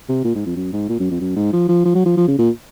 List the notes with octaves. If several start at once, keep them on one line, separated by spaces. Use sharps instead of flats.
C3
A#2
G#2
F2
F#2
G#2
A#2
F#2
F2
F#2
G#2
F3
F3
F3
F#3
F3
F3
C#3
A#2